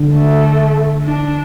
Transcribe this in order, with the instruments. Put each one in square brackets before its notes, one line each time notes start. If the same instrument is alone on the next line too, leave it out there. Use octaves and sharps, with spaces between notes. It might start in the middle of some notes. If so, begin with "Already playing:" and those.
Already playing: [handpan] D3
[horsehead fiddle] A3
D4